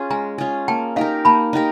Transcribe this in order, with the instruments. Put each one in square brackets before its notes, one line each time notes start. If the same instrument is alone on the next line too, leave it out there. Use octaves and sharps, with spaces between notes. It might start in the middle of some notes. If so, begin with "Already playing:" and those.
Already playing: [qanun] C#4 F4 G#4
[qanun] G#3 [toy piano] G#5 A#5
[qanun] C#4 F4 G#4
[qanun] A#3 [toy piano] G5 A5
[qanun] D#4 G4 A#4 [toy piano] D#5 F5
[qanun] A#3 [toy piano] A5 B5
[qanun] D#4 G4 A#4